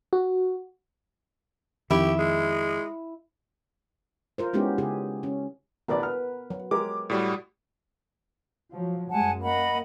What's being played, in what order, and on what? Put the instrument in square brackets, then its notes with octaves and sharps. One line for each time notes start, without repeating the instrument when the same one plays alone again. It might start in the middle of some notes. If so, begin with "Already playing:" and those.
[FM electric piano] F#4
[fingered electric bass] F2 D#3 [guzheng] E4 [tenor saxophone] G4
[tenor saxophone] G#3
[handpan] F4 A#4 C5
G#3 B3 C#4 D#4 E4 G4
C#3 G4 G#4
C#4
[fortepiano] A1 D2 D5 [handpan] B3 A#4 B4
[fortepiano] F6
[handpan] F#3
[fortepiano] G#3 G4 A#4 [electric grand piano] D6
[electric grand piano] A2 G3 F#4
[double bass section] F3 F#3
[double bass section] F#2 G#3 [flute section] F#5 G#5 A5
[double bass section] A#3 [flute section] D#5 F#5 B5